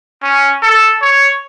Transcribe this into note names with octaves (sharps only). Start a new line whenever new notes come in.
C#4
A4
C#5